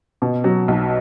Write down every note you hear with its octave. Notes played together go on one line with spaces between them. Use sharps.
B2
F#3
B1